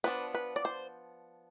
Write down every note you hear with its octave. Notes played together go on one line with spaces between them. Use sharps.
F3 B3 D4 B4
B4
D5
C5